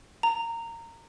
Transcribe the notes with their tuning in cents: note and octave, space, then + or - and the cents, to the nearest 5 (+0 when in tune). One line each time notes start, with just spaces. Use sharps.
A#5 -20